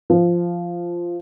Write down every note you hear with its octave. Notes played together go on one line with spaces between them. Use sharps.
F3